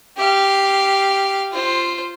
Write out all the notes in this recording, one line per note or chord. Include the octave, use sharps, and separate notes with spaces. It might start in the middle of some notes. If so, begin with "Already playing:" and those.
G4 F5
F4 C5